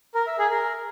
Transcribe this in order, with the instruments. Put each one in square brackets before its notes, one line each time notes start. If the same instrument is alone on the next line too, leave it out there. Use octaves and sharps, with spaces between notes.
[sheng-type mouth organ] A#4
E5
G#4
A#4